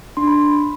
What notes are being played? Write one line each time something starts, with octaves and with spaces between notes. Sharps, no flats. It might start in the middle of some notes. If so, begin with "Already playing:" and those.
D4 C6
B5